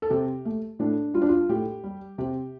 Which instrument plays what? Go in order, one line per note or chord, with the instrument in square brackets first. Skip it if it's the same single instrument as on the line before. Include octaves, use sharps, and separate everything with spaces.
[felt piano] A4
C3 G4
A3
A2 D4
G3 F4
D4
F4
A2 G4
G3
C3 G4